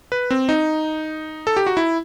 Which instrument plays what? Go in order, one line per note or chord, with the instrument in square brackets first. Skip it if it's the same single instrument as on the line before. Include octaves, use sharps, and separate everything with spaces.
[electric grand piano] B4
C4
D#4
A4
G4
F#4
E4